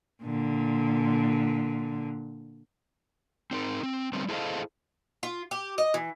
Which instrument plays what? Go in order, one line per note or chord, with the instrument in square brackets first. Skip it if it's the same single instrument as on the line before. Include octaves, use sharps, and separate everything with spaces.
[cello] A#2 D3
[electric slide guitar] C4 D#4 A#4
C4
D3 G3 B3 C4
E4 G#4 A4 C5 D#5 F5
[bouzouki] F4
G4
D#5
E3